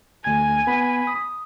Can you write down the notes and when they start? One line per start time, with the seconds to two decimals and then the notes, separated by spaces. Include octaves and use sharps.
0.24 D2 G#5 G#6
0.67 B3 B5
1.07 D#6